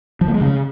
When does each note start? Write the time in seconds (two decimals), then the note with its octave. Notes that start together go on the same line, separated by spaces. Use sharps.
0.21 F3
0.28 A#3
0.34 G#3
0.41 C#3